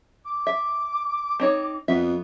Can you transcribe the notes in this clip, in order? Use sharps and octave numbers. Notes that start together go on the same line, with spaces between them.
D6
E5
C4 D#4 C#5
F2 B3 E5